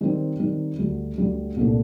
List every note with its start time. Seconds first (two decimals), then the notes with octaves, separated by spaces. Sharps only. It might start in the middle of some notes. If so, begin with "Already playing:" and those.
0.01 D#3 G3 C4 D#4
0.39 D#3 G3 C4 D#4
0.79 D2 D3 G3
1.18 D2 D3 G3
1.57 C2 A#2 A3 D4